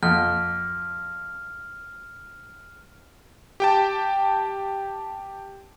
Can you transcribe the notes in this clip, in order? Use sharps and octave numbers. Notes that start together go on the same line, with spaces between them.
F2 F6
G4 G5 A5